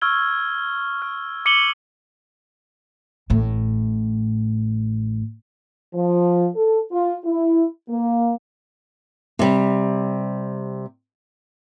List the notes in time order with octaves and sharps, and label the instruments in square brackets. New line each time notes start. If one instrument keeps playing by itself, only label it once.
[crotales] C#6 E6 F6 G#6 G7
F6
D6 C#7 D#7 F#7 G7
[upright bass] A1 A2
[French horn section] F3
A4
F4
E4
A#3
[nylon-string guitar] C3 G3